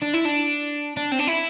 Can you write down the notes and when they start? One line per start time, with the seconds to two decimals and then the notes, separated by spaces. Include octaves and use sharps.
0.02 D4
0.13 E4
0.25 D4
0.97 D4
1.12 C4
1.19 D4
1.28 E4